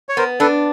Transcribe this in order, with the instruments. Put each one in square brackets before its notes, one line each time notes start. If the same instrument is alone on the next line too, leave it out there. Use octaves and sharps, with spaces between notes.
[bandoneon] C#5
[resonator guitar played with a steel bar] B3 [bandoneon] A#4 C5
[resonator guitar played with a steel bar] D4 [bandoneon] A4 B4